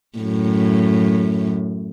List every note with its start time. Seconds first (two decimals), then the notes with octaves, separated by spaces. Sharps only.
0.18 F#2 A2